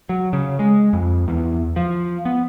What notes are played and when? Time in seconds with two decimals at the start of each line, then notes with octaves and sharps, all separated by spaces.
0.09 F#3
0.33 C#3
0.59 G#3
0.93 F2
1.28 E2
1.76 F3
2.25 B3